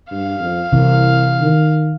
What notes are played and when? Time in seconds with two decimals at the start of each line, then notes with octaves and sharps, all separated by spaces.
0.11 G2 F5
0.40 F2
0.72 C2 C3 E3
1.40 D#3